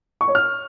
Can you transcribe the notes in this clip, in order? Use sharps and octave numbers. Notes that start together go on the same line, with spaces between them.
C#6
C#5
F6